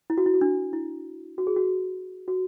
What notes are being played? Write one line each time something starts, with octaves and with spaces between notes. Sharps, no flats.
E4
F#4
E4
F#4
D4
E4
F#4
G#4
F#4
F#4